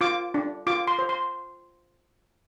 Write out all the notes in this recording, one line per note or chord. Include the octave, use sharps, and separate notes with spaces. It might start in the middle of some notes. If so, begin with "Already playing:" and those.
F4 D6
D4
F4 D6
C6
C5
C6